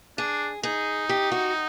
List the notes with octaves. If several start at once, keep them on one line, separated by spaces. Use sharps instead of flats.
D4 G#4
D#4 G#4
G4
F#4